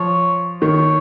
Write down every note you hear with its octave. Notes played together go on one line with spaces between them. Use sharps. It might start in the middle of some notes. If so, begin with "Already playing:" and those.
Already playing: F3 C#5
D#3 C#5